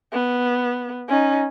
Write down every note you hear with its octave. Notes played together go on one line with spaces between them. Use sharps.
B3
C#4 D#4